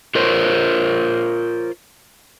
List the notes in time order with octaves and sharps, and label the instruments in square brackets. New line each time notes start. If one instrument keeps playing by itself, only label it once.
[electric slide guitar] F4 A#4 C5 C#5